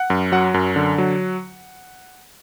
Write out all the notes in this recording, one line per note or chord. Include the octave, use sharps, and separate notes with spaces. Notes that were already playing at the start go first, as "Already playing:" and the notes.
Already playing: F#5
F#2
F#3 F#5
F#2
D3
F#3